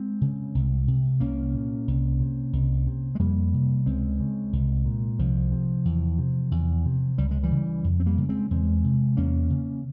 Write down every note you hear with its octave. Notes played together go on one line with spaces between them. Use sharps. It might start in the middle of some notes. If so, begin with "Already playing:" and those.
Already playing: G#3 C4
C#3
C2
C3
C2 A#3 C#4
A#2
C2
C3
C2
C3
G#3
F2 G3 A#3
C3
C#2 G#3 C4
C#3
C2
A#2
C2 F3
C3
E2
C3
E2
C3
C#2 G3
G#3
E3 G3
C#3
F2
C4
G3 A#3
C#3
G#3 C4
E2 G#3 C4
C3
E2 A#3 C#4
C#3